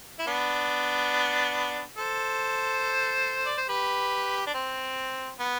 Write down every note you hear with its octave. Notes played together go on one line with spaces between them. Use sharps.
E4
B3 D4
A4 C5
D5
C5
G4 B4
D4
C4
B3